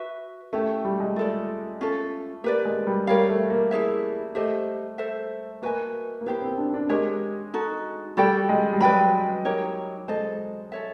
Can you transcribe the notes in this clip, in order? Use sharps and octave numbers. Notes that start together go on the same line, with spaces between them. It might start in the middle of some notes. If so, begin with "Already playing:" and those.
Already playing: F#4 B4 E5
A3 C#4 E4 G4
G3
G#3
A3 F4 A4 D5
C#4 F4 A4
A#3 G4 B4 D5
G#3
G3
G3 A#4 C#5 F5
A3
A#3
E4 G#4 C#5 E5
A3 G4 C5 D#5
A4 C5 E5
A#3 F#4 B4 D#5 G#5
A#3
B3 E4 G4 C5
C4
D4
D4
G#3 G4 A#4 C#5
D#4 F#4 A4
G3 F#4 A4 D5 G5
G#3
G3
F#3 B4 D5 G5 B5
D#4 G4 A#4 C#5
G#3 A4 C5 D#5
A4 C#5 E5